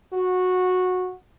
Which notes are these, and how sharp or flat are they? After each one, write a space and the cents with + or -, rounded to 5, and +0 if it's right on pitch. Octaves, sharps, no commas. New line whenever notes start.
F#4 -15